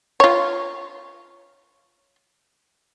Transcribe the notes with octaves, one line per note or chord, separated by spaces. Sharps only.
F4 C#5